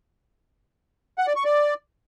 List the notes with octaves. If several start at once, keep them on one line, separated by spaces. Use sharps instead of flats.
F#5
D5
C#6
D5